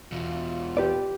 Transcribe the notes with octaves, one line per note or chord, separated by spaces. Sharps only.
E2 B2 F4
G4 B4 D5